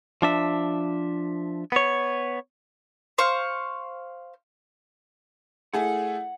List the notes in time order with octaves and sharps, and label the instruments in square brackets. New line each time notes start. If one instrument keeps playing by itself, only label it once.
[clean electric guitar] F3 D4 E5
B3 C#5
[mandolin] C5 F5 C#6
[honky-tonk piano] A3 E4 G#4 [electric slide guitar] F#5